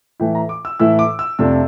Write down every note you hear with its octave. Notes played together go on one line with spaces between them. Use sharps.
A2 E3 A3 E4 G5
A#5
D6
E6
A2 E3 A3 E4 E6
D6
E6
F2 C3 F3 A3 D4 E6